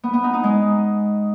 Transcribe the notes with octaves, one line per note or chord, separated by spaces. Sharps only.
B3
B3
D#4
D#4
G#3